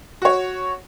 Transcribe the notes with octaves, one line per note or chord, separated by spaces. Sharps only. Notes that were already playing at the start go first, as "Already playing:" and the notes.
F#4 C#5